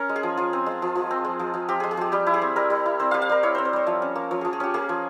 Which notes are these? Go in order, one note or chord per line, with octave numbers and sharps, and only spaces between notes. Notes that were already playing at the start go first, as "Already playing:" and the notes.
Already playing: C#4 A#4
G#3
G#4
F3
F3 F4
C4
G#3
F3
F3
C4
G#3
F3
F3
C4 G4
G#3 G#4
G#4
F3 G4
G3 G4
E4
G#4
C4
G3 A#4
G3
E4
C4 C5
G3 F5
F5
G3 A#4
E4 C#5
C4 C5
C5
G3 C#5
F3 E5
C#4
A#3
F3 C#5
F3 G#4
G#4
C#4 G4
A#3 G#4
F3